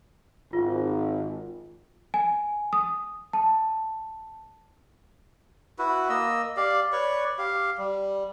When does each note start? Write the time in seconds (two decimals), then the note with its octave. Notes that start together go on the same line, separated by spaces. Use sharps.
0.53 G#1 F4
2.14 G#5
2.73 D#6
3.33 A5
5.79 E4 F#4 B4
6.09 A#3 D#5 E6
6.57 G4 D5 F5
6.92 B4 C#5 D5 C#6
7.38 G4 F5
7.78 G3